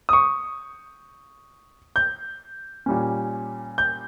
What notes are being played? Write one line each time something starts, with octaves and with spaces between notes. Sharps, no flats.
D#6
C#6
G6
A#2 G3 C#4
G6